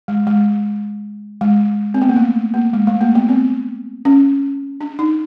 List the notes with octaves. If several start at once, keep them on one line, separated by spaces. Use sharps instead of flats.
G#3
G#3
G#3
C4
B3
A#3
A3
A#3
G#3
A3
A#3
B3
C4
C#4
D4
D#4